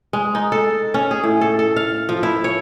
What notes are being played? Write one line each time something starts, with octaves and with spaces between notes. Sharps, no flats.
G#3
D#4
A4
C#4
G#4
A2
A4
A4
F5
F3
E4
C#5